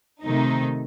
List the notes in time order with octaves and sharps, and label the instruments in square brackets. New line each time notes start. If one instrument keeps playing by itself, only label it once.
[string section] C3 D#3 A3 D#4